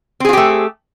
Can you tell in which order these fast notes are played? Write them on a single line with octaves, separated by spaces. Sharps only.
C4 G#4 F4 G4 A3